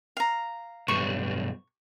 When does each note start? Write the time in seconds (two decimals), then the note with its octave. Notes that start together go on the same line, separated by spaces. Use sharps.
0.17 F5 A#5
0.88 B1 G2 C#6